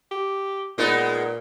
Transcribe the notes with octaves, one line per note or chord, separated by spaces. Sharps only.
G4
A#2 G#3 B3 D#4